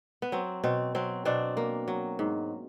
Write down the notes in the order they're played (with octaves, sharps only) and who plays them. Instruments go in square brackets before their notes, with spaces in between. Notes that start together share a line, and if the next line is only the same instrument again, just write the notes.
[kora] B3
F#3 C4
B2 C4
F#3 C4
B2 C4 D4
A#3
F#3
G#2